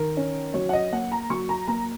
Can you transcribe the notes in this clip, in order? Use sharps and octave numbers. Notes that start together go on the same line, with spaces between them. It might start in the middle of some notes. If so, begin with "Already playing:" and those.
Already playing: D#3 A#4
C#4
F#3 C#5
F#5
D#5
A#3 F#5
A#5
F#3 C#6
A#5
A#3 A#5